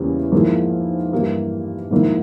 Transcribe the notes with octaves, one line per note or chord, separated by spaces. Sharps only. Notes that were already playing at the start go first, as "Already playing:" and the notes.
Already playing: E2 C#3 E3 G3 A#3
G#2 F3 A#3 E4 G#4
G2 E3 A#3 E4 G4
G#2 F3 A#3 E4